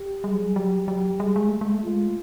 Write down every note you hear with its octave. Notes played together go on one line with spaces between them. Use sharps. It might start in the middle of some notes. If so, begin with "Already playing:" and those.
Already playing: G4
G3 G#4
F#3
G3
F#3 G4
F#3 G4
G3 G#4
G#3
A3
G#3
A3
G#3 F4
A3